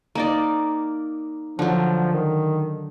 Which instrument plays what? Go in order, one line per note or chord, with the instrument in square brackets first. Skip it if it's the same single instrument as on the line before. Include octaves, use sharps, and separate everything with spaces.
[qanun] A#3 D#4 D5
[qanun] D3 F#3 [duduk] F3
[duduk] D#3